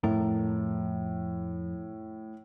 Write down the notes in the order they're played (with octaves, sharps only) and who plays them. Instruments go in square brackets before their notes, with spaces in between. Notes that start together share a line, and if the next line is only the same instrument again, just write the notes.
[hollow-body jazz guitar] F2 A4 A#4 [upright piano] A2